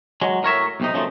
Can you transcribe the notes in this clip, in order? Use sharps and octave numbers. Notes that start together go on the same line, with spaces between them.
F#3 G#3
A2 A#4 C#5 E5
B1 C3 D#4
F#2 C#3 F3 A3 D#4